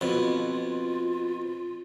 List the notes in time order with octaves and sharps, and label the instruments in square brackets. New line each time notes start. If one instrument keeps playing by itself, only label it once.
[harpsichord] F2 B2 [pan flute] F4